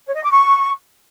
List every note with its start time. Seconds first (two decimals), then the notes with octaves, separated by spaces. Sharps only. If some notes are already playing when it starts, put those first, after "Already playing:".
0.07 C#5
0.15 D#5
0.23 D6
0.30 C#6